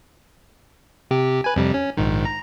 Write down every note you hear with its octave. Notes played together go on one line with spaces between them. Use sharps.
C3 G4
B4 G#5
F2 C3 G3
C#4
A#1 G#2 D#3
A#5